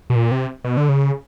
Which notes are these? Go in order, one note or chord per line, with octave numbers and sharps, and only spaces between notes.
B2
A#2
C3
B2
D3
C#3